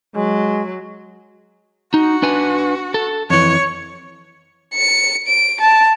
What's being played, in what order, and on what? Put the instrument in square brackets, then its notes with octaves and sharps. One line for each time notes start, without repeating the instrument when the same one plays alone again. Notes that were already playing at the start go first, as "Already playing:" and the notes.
[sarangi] F#3 [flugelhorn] G#3
[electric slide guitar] D#4 [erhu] F#4
[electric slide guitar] D4 B4 G#5
A4
[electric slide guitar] F2 E3 [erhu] C#5
[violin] C#7
D7
A5